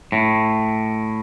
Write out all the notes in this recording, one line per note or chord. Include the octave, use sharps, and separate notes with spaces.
A2